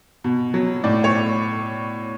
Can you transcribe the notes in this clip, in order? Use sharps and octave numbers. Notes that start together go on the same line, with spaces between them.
B2
F#3
A2 D5
C#5